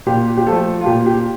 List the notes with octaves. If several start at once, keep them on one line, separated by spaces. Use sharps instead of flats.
A#2 G4
G4
F3 A3 A4
F4
A#2 G4
G4